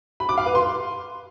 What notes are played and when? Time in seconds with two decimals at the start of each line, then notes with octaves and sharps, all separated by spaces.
0.20 B5
0.29 D6
0.38 F5
0.46 B4
0.55 C6